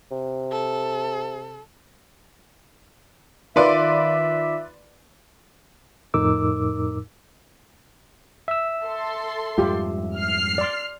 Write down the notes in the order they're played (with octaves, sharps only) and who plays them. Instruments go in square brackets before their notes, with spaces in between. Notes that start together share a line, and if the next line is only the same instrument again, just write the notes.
[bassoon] C3
[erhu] A4
[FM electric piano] D#3 F4 D6 [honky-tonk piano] B4 D5 C6 [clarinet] E5
[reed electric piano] F2 A2 D#4 A#4 D6 E6
[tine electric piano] E5 E6
[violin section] A4 C6
[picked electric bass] F2 G#2 G3 [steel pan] F4 G4
[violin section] F6 C7
[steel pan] D5 C6